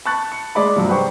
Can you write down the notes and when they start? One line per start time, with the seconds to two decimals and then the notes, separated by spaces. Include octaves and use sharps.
0.05 A5 B5 C#6 F#6 A6
0.32 C#7
0.55 G#3 D5 B5
0.76 G2 C3 F3 F#3
0.89 B4 C5 G5 C#6